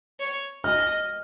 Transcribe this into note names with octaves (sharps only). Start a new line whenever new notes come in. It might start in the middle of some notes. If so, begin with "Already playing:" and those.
C#5
D#5 F6